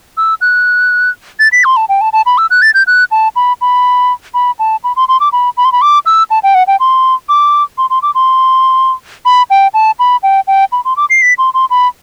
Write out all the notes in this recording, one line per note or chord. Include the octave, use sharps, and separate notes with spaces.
E6
F#6
A6
B6
C6
A5
G5
A5
A5
B5
E6
F#6
A6
G6
F#6
A5
B5
B5
B5
A5
B5
C6
C6
D6
B5
B5
C6
B5
D6
E6
A5
G5
F#5
G5
C6
D6
C6
C6
D6
C6
B5
G5
A5
B5
G5
G5
B5
C6
D6
C7
B6
C6
C6
B5